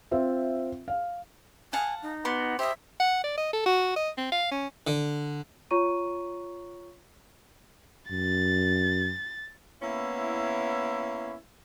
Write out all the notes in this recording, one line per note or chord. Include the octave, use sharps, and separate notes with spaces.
C4 F4 E5
F5
F5 F#5 G#5 A5
D#4
B3 F#4 C6 D6
G4 C5 D#5 E5
F#5
D5
D#5
A4
F#4
D#5
C4
F5
C#4
D3
F4 C#5 A#5 C#6 D#7
F#2 A6
A#3 B3 C#4 E4